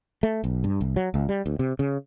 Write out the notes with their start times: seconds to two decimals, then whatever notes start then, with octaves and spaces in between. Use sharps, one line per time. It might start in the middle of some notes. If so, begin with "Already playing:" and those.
0.23 A3
0.44 B1
0.64 G2
0.81 C2
0.96 F#3
1.14 C#2
1.29 G3
1.46 D2
1.59 C3
1.79 C#3